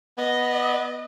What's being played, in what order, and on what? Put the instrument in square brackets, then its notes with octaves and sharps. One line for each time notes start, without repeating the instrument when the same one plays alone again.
[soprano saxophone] B3 [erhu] D#5